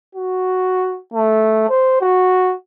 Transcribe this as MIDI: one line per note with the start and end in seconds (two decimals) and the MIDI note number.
0.15 0.98 66
1.13 1.67 57
1.69 2.00 72
2.01 2.54 66